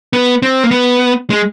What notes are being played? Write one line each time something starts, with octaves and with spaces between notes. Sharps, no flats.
B3
C4
A#3
B3
G#3